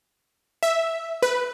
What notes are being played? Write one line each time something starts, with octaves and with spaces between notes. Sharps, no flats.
E5
B4